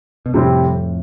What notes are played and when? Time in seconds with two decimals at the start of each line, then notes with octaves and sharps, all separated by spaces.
0.26 B2
0.34 F2 A2 C3 G3 C4 E4